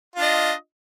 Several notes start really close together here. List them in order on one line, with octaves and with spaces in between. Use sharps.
F4 D4 D#5